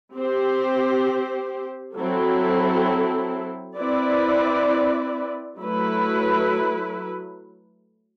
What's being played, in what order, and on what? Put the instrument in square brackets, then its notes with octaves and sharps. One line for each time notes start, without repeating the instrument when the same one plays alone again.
[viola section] C4 G4 C5
F#3 C4 E4 A4
C4 E4 B4 D5
F#3 A3 E4 B4